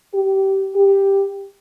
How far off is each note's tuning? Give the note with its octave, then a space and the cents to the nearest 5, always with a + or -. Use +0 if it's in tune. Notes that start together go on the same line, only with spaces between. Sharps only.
G4 -20
G4 +5